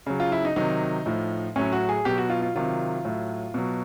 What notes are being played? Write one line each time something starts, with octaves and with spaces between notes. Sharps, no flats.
C#3 F#3
F4
E4
D#4
C3 D#3 F#3 D#4
A2 F3
A2 F#3 C#4
F#4
G#4
B2 F#3 G4
F#4
F4
F4
C3 D#3 F#3 F4
A2 F#3
B2 F#3